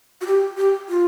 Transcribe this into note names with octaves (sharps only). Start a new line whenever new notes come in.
F#4
G4
G4
F4